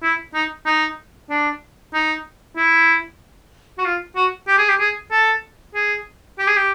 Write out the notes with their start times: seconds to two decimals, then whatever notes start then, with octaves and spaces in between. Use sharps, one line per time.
0.03 E4
0.34 D#4
0.66 D#4
1.29 D4
1.94 D#4
2.57 E4
3.79 F#4
3.85 F4
4.16 F#4
4.48 G4
4.58 G#4
4.69 G4
4.80 G#4
5.12 A4
5.75 G#4
6.39 G4
6.47 G#4
6.57 G4